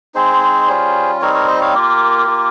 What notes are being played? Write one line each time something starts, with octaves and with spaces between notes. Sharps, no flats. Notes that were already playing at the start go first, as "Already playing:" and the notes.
G#3 C4 D#4 G#4 C5
G3 C#4 F4
G3 C4 D#4 A#4 C#5
A#4 C#5
C5 D#5
C#5 F5
A#3 F4 G4 A#4
A#3 F4